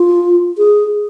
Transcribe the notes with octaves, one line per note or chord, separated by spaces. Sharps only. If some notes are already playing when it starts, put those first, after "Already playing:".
Already playing: F4
G#4